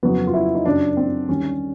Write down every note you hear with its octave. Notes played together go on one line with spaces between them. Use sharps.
F2 C#3 F#3 B3
F4
E4
D#4
F#2 C#3 F#3 D4
C4
D#2 D3 G3 C#4